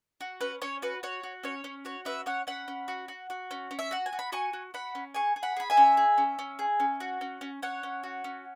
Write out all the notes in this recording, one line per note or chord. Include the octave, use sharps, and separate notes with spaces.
F#4
C#4 B4
C#4 C#5
F#4 B4
F#4 C#5
F#4
C#4 C#5
C#4
F#4 C#5
C#4 B4 E5
C#4 C#5 F#5
C#4 F#5 B5
C#4
F#4
F#4
F#4
C#4
C#4
E5
F#4 F#5
G#5
F#4
B5
F#4 G#5 C#6
F#4
F#4 F#5 B5
C#4
G#4 G#5 C#6
G#4
F#5 B5
G#4 B5
E5 G#5
C#4
G#4
C#4
C#4
G#4
C#4
F#4
C#4
C#4
C#4 C#5 F#5
C#4
F#4
C#4